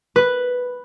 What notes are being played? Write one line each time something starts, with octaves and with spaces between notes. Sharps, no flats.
B4